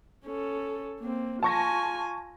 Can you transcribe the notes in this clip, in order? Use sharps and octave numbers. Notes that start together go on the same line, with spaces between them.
C#4 A4
A#3 C4
F4 G#5 A5 C#6 A#6